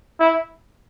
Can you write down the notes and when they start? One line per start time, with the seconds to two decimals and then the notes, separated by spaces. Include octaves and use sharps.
0.20 E4